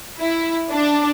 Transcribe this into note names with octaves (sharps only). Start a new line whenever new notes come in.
E4
D4